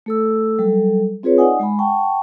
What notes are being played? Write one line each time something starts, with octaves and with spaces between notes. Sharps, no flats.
A3 A4 E6
F#3 G3 A4
C4 F4 G#4 B4 C#5
D#4 D5 D#5 F#5 G#5 D#6
G#3 G#5 B5
F#5 G5 A5 C#6